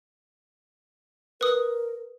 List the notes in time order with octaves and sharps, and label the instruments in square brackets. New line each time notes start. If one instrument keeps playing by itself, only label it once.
[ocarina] A#4 [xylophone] B4 D#6